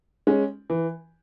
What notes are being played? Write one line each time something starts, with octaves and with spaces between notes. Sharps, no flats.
G#3 C#4
E3